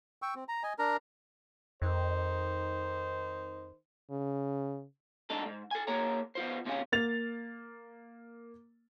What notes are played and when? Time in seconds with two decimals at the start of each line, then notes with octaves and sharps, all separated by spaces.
0.22 G5 C#6 E6
0.35 C4
0.48 A#5
0.63 D#5 G#5
0.79 D4 A#4 A#5
1.82 F2 D#3 D#4 C5
4.11 C#3
5.30 G#2 D4 D#4 A4
5.46 G#2
5.71 A4 G#5
5.87 A#3 G#4 C#5 A#5
6.35 B3 F4 C5
6.65 D#2 C3 C#4 F4 G#4
6.92 A#3 A6 F7